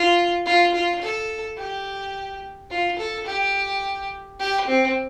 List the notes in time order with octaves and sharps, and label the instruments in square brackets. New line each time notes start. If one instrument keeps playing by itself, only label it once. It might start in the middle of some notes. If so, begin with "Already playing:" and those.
Already playing: [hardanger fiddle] F4
F4
F4
A4
G4
F4
A4
G4
G4
C4